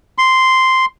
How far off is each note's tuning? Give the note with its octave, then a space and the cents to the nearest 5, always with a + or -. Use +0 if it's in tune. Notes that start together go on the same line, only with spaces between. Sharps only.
C6 -5